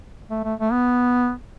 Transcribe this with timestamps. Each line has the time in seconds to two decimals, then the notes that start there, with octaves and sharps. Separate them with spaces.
0.30 A3
0.44 A3
0.59 A3
0.72 B3